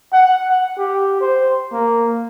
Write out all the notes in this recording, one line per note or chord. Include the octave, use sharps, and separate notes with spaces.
F#5
F#5
G4
C5
A#3